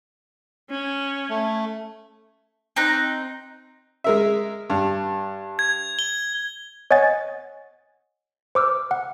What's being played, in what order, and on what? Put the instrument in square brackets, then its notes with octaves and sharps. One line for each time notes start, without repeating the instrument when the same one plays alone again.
[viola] C#4
[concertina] A3
[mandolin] C4 D#4 A#5 F#6
[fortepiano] G#3 A#4 E5
G2
[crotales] G#6
G7
[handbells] C#5 D#5 F#5 G#5 A6
C5 D6 E6 F6
F#5